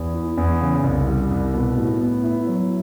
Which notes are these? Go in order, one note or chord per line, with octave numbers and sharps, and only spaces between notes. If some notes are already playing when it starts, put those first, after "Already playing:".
Already playing: E2
E3
E2
C#3
C2
G3
C2
B2
A2
B3
E4
F#3